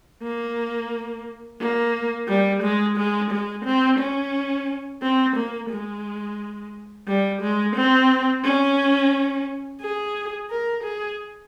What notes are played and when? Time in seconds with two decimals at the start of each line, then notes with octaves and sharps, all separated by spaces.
0.23 A#3
1.60 A#3
2.28 G3
2.62 G#3
2.97 G#3
3.31 G#3
3.65 C4
3.99 C#4
5.02 C4
5.36 A#3
5.70 G#3
7.07 G3
7.42 G#3
7.76 C4
8.44 C#4
9.81 G#4
10.50 A#4
10.84 G#4